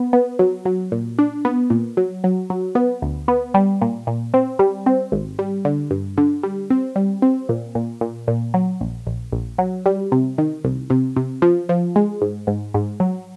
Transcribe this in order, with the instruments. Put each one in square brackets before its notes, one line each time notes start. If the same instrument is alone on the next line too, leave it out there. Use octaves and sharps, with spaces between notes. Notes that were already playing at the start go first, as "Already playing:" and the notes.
Already playing: [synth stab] B3
B3
F#3
F#3
A#2
D4
B3
A#2
F#3
F#3
F#3
B3
D2
B3
G3
A#2
A#2
C4
G3
C4
G#1
G3
D3
G2
D3
G3
C4
G3
C4
A#2
A#2
A#2
A#2
F#3
A#1
A#1
A#1
F#3
G3
C3
D#3
C2
C3
C3
F3
F3
G#3
G#2
G#2
G#2
F#3